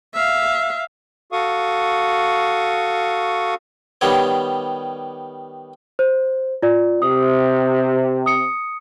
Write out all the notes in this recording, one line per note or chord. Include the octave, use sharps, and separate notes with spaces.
E5 F5
F#4 A4 F5 C#6 D#6
D#3 G3 B3 C#5
C5
F4 D5
C3 D#6
D#6 C#7